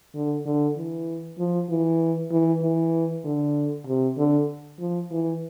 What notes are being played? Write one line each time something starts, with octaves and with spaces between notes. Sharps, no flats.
D3
D3
E3
F3
E3
E3
E3
D3
C3
D3
F3
E3